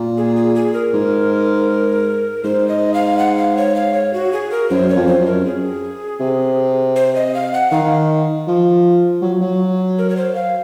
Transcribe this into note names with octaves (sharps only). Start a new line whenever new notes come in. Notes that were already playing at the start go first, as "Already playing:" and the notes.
Already playing: A#2
G#4
G#4
G#4
A#4
G#2
G#2 C5
D#5
F5
F#5
F5
C#5
F5
C#5
F#4
G#4
A#4
F#2 C5
C#5
F2
C5
F#2
A#4
G#4
C3
C5
D#5
F5
F#5
D#3 F5
F3
F#3
F#3
A#4
C#5
C5
F5